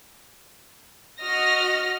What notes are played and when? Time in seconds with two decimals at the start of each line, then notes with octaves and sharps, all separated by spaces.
1.20 F#4 D#5 F6 A#6